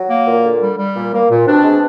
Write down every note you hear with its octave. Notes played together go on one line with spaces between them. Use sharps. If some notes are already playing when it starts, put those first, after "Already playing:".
Already playing: F#3
A#3
A#2
D3
G3
G3
A#2
A#3
A#2
B2 C4 D4
G#3